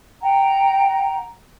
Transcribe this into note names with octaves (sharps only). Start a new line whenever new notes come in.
F#5 G5 A#5